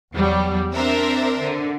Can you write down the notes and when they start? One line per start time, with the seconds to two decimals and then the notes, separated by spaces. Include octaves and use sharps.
0.13 E2 F#3 G3
0.73 C4 D4 A#4 C5 E5
1.42 D3